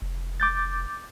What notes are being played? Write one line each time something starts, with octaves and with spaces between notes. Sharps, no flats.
F1
D6 G6 A6